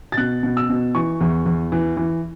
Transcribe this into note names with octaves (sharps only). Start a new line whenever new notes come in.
A6
B2 F#6
B2
E6
B2
E3 C#6
E2
E2
E3
E3